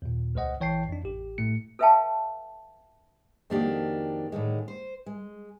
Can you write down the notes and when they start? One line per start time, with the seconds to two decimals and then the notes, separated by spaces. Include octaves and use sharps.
0.02 D#2 A#2
0.35 C#2 G#3 C5 D#5 F#5
0.60 A#1 E3 C#5 G5 A5 C7
0.89 F2 D4
1.03 A1 G4
1.38 A2 A3 C#7
1.79 A4 B4 E5 F5 G5 A5
3.50 F2 D#3 A#3 D4 F#4 G4
4.32 A2 D3 D#3 G#3
4.68 C5
5.06 G#3